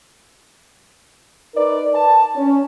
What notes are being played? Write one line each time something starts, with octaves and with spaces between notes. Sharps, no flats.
D#4 A#4 B4 D5
A5
C#4